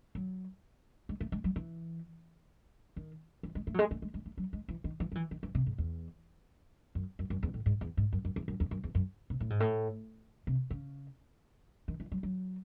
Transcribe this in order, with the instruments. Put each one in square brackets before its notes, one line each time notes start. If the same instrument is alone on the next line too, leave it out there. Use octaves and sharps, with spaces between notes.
[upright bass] F#3
G#3
A3
G#3
F#3
E3
D#3
E3
G#3
A3
F#3
G#3
A3
G#3
G#3
A3
F#3
G#3
E3
D#3
E3
F#3
E3
D#3
E3
C3
G#2
E2
F#2
F#2
F#2
E2
A2
G#2
E2
G#2
F#2
F#2
E2
F#2
E2
F#2
E2
F#2
C3
A2
G#2
A2
C3
C#3
D#3
E3
F#3
F#3